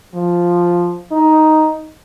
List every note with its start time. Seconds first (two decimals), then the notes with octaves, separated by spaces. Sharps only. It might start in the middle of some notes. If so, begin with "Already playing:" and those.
0.14 F3
1.12 D#4